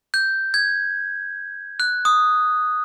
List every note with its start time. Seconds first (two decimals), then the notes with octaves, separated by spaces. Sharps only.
0.14 G6
0.54 G#6
1.80 F#6
2.05 D#6